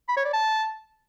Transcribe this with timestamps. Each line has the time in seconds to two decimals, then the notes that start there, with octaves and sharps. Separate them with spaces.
0.09 B5
0.17 C#5
0.25 D5
0.33 A5